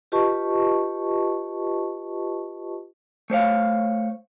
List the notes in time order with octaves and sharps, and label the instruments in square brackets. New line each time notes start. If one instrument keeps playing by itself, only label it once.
[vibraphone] F4 G4 B4 D#5 A5 C#6
[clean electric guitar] A3 C5 C#5 F5